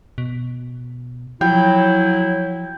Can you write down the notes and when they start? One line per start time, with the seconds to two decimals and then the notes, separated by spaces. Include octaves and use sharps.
0.18 B2
1.41 F3 F#3 E4 G5